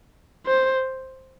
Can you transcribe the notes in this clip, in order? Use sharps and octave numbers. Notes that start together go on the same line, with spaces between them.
C5